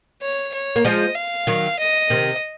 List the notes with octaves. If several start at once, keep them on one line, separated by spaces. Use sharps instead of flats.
C#5
C#5
A#3
F3 G#3 D#5
F5
D#3 F#3
D#5
C3 D#3